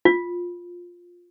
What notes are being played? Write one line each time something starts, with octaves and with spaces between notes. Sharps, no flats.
F4